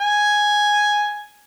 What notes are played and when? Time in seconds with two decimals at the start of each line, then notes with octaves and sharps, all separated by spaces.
0.01 G#5